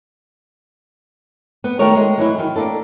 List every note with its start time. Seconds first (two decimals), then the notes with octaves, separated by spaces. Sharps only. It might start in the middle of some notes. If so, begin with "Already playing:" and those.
1.64 B3
1.79 D#3 A3 F#4 A#4 C#5
1.95 G#3
2.18 E3 F#3 E4
2.38 D#3
2.56 A#3 D4 A4